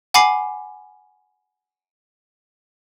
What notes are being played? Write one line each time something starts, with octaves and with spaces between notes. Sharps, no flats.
F#5 G#5 B5 D6 C7